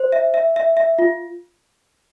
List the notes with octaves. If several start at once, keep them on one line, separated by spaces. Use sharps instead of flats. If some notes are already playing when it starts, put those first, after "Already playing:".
Already playing: C5
E5
E5
E5
E5
F4